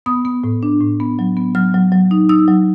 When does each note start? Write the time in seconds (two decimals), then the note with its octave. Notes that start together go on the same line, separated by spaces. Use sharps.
0.06 B3 D#6
0.25 B3
0.44 A2
0.63 D4
0.80 A2
1.00 B3
1.19 F#3
1.37 B3
1.55 F#3 F6
1.74 F#3
1.92 F#3
2.11 D#4
2.29 D#4 E6
2.48 F#3